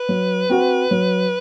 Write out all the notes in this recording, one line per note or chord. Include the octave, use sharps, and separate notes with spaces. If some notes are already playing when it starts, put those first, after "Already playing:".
Already playing: B4
F#3
C4 F#4
F#3